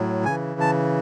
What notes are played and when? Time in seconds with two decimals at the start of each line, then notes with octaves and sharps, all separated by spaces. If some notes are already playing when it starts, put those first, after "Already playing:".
Already playing: A2 F#3
0.25 C#3 E3 G#5
0.60 A5